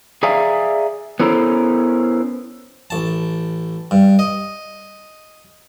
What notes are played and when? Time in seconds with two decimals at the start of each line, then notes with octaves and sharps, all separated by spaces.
0.23 G#4 D5 E5 F5 G#5 A#5
1.20 B3 C#4 E4 A4 A#4 C5
2.90 A1 A5
3.91 G2
4.19 D#5